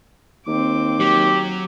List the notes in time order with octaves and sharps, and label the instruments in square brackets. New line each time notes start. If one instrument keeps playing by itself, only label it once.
[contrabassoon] D#2 [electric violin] C4 D6
[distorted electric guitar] F#3 [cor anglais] G4